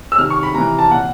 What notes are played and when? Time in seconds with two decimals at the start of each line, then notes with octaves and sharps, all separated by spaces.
0.12 E6
0.18 C3 D#3 F6
0.30 C#6
0.43 B5
0.55 C3 E3 A#5
0.79 A5
0.91 A#2 F#5